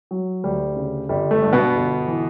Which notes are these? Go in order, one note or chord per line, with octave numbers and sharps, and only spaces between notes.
F#3
D2 G3
C#3
G1 G3
A3
G2
B2 B3
G1
E3